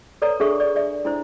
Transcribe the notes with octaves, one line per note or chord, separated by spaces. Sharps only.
A4 B4 C#5 D5 A#5
D4 G#4 A4 E5 C#6
D5
D5 E5 G#5
D4 E4 C5